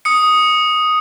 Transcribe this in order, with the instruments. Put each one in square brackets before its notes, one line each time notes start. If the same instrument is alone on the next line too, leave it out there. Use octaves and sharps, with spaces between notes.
[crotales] D#6 C#7